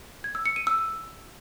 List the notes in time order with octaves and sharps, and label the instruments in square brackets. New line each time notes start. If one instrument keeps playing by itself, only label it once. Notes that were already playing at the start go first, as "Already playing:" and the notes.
[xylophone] G#6
E6
C#7
D#7
E6